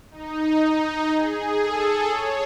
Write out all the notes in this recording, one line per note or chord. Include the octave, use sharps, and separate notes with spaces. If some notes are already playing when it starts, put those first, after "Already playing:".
D#4
D#4
G#4
A4
C#5